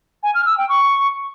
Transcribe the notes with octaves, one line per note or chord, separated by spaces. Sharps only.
G#5
F6
E6
G5
C#6